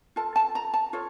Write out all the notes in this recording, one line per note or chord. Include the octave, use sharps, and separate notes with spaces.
F4 A4 A5
A5
A#5
A5
F4 A4 C#5